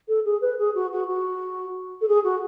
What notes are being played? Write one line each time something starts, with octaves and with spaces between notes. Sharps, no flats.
A4
G#4
B4
G#4
F#4
F#4
F#4
A4
G#4
F#4